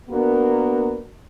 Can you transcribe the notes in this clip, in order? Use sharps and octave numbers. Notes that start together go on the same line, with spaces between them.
A#3 B3 D4 F#4 A#4